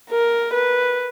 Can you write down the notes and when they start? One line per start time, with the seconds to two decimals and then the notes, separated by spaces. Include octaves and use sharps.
0.10 A#4
0.53 B4